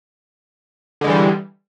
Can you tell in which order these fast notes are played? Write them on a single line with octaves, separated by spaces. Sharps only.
D3 G#3 E3 G3